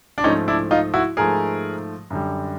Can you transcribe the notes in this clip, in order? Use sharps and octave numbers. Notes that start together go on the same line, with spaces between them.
D4
G#2 F3 A3 C#4 D#4
D4 E4
D#4 F4
E4 F#4
G#2 F3 A3 G#4 A#4
F#2 D3 G3